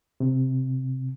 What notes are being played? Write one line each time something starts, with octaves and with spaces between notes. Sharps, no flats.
C3